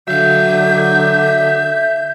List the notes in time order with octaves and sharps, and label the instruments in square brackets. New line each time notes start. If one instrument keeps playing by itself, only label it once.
[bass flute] D3 [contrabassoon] F#3 [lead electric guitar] E5 F5 [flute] G6